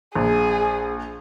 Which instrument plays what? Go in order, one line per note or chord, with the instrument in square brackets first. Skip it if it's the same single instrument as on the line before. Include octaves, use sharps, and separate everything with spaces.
[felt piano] A#1 [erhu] G#4